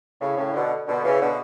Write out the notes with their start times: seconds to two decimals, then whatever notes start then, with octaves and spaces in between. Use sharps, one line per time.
0.20 A2 C#3
0.37 A2 C#3
0.53 B2 D3
0.86 B2 D3
1.03 C#3 E3
1.20 B2 D3